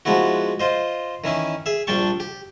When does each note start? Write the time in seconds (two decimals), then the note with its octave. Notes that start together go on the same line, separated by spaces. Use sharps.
0.05 F3 G#3 B3 E4 F#4
0.60 F4 C5 D#5
1.24 D#3 E3 C#4 E4
1.66 G#4 E5
1.87 A#1 G3 D4 G5 A5 C#6
2.20 G4